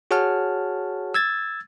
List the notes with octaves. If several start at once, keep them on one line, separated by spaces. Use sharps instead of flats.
F#4 G#4 C#5 F#5 A5 F6
E6 G#6 A6